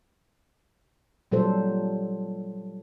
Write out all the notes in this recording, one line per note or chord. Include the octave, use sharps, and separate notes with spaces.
A#2 F#3 G3 A4 C5